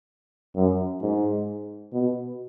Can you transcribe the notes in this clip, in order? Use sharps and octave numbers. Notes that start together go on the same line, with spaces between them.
F#2
G#2
B2